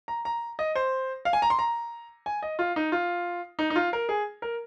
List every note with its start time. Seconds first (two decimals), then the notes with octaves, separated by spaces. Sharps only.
0.08 A#5
0.25 A#5
0.59 D#5
0.75 C5
1.25 F5
1.33 G#5
1.42 A#5
1.50 C6
1.59 A#5
2.26 G#5
2.43 D#5
2.59 F4
2.76 D#4
2.92 F4
3.59 D#4
3.70 D#4
3.76 F4
3.93 A#4
4.09 G#4
4.42 A#4